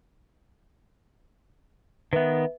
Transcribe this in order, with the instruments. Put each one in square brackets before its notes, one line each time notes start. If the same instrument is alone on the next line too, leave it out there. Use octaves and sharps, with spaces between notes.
[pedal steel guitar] D#3 B3 [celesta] B4 E5